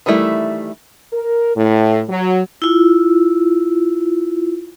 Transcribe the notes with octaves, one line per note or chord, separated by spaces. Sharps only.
D#3 E3 G3 A3 E4
A#4
A2
F#3
E4 F4